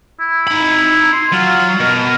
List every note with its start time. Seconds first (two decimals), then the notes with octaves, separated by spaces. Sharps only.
0.20 E4
0.48 D#4 B5
1.12 C6
1.32 F#3 F4
1.80 B2 A#4